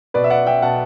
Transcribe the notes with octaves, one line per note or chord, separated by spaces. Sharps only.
B2 B4 D5
E5
D5 F#5
E5 G5
B2 F#5 A5